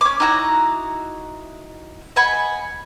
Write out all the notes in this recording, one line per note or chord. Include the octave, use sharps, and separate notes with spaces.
C#4 D6
D#4 E4 F#4 A#5
D#5 F#5 G#5 B5